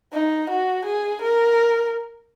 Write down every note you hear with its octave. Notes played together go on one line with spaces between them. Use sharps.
D#4
F#4
G#4
A#4